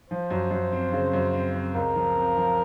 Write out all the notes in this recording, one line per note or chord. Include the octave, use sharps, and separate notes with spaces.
F3 C5
F#2
F#2
C4
C#3
F#2
C4
C4
C#2 A#4
F3
C4
F3